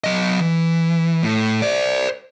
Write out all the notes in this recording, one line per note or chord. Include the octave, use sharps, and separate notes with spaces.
F#3 D#5
E3
A2
C5 D5